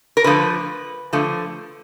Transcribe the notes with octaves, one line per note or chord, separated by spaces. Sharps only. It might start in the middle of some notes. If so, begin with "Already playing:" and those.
A#4
D3 F3 A3 B4
D3 F3 A3